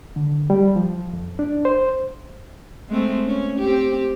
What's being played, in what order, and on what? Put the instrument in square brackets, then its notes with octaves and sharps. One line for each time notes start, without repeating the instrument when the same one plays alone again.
[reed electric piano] D3
G3
F3
F2
D4
C5
[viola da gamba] G#3 A3 C4
C#4
C4 G4